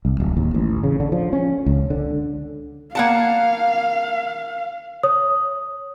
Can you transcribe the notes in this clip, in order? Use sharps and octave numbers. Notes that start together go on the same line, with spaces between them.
C2
D1
D#2
A1
C#3
D3
F3
C#4
C#2
D3
A#3 F5 F#5 A5
C#5 D#6